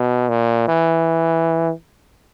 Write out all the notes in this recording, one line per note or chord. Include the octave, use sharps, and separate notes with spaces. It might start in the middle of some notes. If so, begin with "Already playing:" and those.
Already playing: B2
A#2
E3